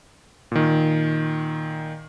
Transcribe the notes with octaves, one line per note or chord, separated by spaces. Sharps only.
A#2 D#3